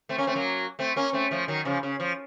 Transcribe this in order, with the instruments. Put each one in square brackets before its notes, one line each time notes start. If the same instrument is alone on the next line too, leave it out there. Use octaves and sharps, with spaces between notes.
[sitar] A3 C4
A#3 C#4
A3 C4
F#3 A#3
A3 C4
A#3 C#4
A3 C4
F3 A3
D#3 F#3
C#3 F3
C#3
F3